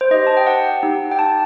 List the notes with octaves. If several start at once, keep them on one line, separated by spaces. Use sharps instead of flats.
C5
D#4 G4 D#5
A5
G5
F#5
D#4 G4
G5
A5